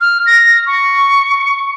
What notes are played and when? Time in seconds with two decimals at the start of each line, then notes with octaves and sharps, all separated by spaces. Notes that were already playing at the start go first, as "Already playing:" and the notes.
0.01 F6
0.26 A#6
0.66 C#6